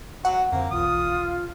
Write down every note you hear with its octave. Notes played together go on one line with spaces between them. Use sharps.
F#3 F#4 F#5
F2 D3 A#3 C4
E1 B1 E3 F4 D#6